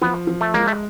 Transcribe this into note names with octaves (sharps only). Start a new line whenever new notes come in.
F3 B3
F3
A3
G#3 A#3
A3